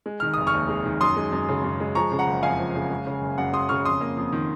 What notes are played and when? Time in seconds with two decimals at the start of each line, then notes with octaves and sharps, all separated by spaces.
0.06 G#3
0.20 D#3 F6
0.34 F1 D#6
0.47 C#6 F6
0.54 D#2
0.69 G#3
0.85 D#3
1.01 F#2 C6 D#6
1.17 G#3
1.32 F#2
1.49 C#3
1.64 F#2
1.80 G#3
1.95 F3 A#5 C#6
2.12 C#3
2.19 F#5 A#5
2.27 F#1
2.43 F2 F5 G#5
2.59 F3
2.75 C#3
2.90 G#3
3.07 C#3
3.22 F#1
3.38 F#2 F#5
3.53 G#3 C6 D#6
3.69 C#3 C#6 F6
3.85 F2 C6 D#6
4.01 A#3
4.17 F2
4.32 D#3